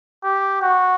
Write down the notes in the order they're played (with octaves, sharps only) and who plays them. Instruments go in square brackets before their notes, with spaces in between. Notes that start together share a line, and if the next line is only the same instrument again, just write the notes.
[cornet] G4
F#4